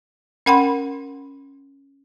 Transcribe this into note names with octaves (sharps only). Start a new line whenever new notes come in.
C#4 A#4 F#5 G5 B5 C6